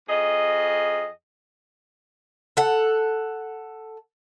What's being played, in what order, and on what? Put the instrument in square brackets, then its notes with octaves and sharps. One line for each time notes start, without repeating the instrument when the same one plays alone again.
[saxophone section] F2 G#4 D#5
[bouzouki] A4 F#5